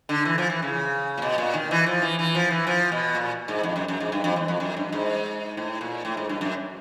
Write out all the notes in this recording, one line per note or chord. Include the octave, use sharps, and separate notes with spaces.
D3
E3
F3
E3
C#3
A#2
B2
A#2
D#3
E3
F3
E3
E3
F3
E3
F3
B2
A#2
G#2
F2
F#2
F#2
G#2
G2
F2
E2
F2
F#2
G2
G#2
A2
A#2
A2
G#2
G2
F#2